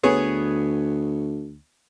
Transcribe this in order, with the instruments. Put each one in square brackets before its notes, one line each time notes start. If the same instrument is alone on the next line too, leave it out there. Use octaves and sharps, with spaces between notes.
[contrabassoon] D2 [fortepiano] B3 G#4 C#5